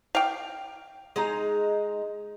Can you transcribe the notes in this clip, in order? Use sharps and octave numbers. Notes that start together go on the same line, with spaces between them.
F5 G5
G#3 D#4 A#5